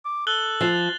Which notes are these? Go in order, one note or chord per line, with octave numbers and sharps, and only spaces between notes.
D6
A4 F#6 F#7 G7
F3 F#6 A6 F7